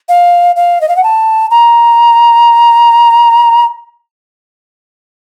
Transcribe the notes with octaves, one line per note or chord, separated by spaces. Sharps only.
F5
F5
D#5
F5
F#5
A5
A#5